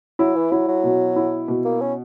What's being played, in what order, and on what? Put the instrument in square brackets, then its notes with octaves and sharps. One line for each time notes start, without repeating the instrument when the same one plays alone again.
[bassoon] F#3 [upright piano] E4
[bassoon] E3
[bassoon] F#3 [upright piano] E4
[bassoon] F#3
[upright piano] B2
E4
B2
[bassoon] A#3
C#4